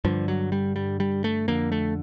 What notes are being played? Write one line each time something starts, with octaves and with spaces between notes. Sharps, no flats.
G2 D3 F3
F#3
G3
G3
G3
A3
F2 D3 A#3
A3